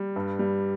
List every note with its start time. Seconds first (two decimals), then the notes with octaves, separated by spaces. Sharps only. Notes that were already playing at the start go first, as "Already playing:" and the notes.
Already playing: G3
0.16 G2
0.39 G3